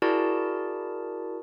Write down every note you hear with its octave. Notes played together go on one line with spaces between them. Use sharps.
E4 F#4 G#4 A#4 D5 A5